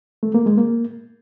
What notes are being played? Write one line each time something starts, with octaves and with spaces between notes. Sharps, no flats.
A3
A#3
G#3
A#3